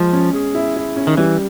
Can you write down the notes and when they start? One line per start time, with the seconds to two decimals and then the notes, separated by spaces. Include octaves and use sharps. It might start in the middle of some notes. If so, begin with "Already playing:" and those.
Already playing: F3 G#3
0.13 C#4
0.34 G#4
0.55 E4
0.76 E4
0.96 C#4
1.07 D#3
1.17 E3 G3